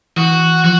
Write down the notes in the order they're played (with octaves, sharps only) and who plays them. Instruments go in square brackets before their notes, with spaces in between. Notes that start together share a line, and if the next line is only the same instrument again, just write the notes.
[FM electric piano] E3 [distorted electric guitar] F#4
[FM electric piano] F3 [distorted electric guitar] F#4